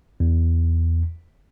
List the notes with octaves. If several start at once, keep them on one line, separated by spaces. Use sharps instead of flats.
E2